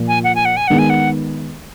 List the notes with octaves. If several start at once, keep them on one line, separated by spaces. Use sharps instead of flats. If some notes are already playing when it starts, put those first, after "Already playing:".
Already playing: A#2 F3 A#3
G#5
F#5
G#5
F#5
G#5
D#3 G#3 B3 D#4 F#5
G#5
F#5